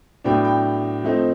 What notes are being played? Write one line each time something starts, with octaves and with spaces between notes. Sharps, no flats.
A2 F#3 B3 D4 G5
G5
F3 A3 C4 D#4